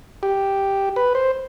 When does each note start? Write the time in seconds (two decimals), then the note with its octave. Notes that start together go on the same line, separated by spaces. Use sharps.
0.23 G4
0.96 B4
1.15 C5